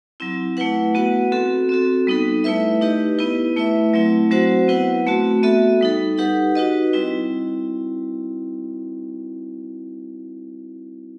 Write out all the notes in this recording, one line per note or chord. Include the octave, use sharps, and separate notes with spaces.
F#3 C4 E4
A3 E4 B4 F#5
B3 F#4 B4 F#5
C4 F#4 A4
C4 F#4 A4
G3 B3 D#4 A4
A3 E4 B4 E5
D#4 G4 B4 D#5
B3 E4 B4
A3 E4 B4 E5
F#3 A3 C4 E4
F#3 C4 F#4 C5 F#5
B3 E4 B4 F#5
A3 C4 F#4
B3 F#4 A4 E5
G3 D#4 A4
D#4 G4 B4 F#5
D#4 F#4 B4 D#5
G3 C4 E4